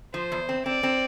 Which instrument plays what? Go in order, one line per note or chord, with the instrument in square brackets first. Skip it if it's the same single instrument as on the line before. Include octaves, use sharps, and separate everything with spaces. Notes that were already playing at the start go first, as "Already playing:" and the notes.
[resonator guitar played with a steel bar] F3 [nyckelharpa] C5
[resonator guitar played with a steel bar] E2
C4
[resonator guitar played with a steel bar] C4 [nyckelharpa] D5
[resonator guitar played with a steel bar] C4